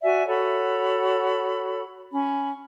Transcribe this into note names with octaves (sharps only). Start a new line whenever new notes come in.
F#4 D5 E5 G#5
F#4 A4 C#5 B5
C#4 B5